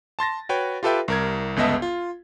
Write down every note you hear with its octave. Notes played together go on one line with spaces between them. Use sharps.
A5 C6 A6 A#6
F#4 B4 C#5 G5
F4 G4 A4 B4 E5 G5
C2 A#4 G#6
G1 C#2 B3 D#5 E5 A5
F4